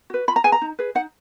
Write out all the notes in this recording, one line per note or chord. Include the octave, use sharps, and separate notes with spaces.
F#4 B4
F4 B5
A#5
G#4 B4 G#5
A#5
D#4
G#4 B4
D#4 F#5